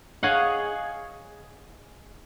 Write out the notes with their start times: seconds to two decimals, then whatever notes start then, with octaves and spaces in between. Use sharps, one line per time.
0.23 G#4 C#5 D#5 F5 F#5